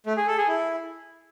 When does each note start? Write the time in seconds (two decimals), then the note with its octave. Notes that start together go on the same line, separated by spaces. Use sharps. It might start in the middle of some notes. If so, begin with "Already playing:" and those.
0.06 A3
0.17 G#4
0.27 A4
0.38 G#4
0.48 E4